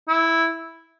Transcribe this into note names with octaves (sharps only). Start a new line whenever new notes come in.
E4